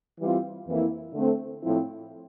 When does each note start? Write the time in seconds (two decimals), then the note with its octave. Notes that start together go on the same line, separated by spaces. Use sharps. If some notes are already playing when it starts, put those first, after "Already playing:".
0.19 E3 G3 C4 F4
0.67 F2 E3 A#3 E4
1.13 D3 A3 C4
1.61 A2 F3 C4 E4